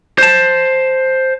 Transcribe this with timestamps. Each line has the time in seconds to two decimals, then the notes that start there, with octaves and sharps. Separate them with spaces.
0.18 C5 A5